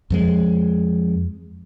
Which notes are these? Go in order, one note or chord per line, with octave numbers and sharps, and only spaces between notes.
F2 F3 G#3